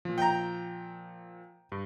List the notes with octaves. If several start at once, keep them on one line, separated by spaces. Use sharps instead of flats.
A#2 F3
G5 A#5
G2